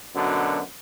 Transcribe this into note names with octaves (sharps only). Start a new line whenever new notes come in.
F#2 B2 D3